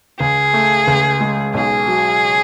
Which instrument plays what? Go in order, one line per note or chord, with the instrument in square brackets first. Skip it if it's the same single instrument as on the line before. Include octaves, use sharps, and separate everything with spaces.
[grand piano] C#2 [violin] G#4
[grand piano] A3
C#2
G#3
[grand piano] B1 [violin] G#4
[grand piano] F#3